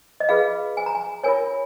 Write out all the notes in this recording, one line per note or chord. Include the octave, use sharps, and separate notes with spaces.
D#5
F4 G#4 B4 F5
G#5
A#5
G#5
F4 A#4 C#5 G#5